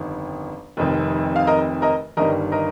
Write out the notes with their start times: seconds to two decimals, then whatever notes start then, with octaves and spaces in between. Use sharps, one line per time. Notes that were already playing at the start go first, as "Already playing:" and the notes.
Already playing: G1 F2 D#3
0.77 F1 F2 C3 D#3
1.36 F5
1.47 A#4 D#5
1.82 A#4 D#5
2.17 G1 G2 D#3 G3 A#4 D#5
2.52 A#4 D#5